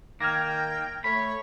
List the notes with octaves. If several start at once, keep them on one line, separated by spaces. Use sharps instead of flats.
D#3 A#3 G5 F6 G#6 A#6
A3 C#5 B5